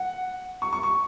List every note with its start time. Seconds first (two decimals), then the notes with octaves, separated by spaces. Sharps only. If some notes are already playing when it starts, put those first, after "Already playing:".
Already playing: F#5
0.62 C#6
0.73 C#6
0.83 C#6